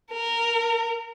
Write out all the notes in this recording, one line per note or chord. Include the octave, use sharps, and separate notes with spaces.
A#4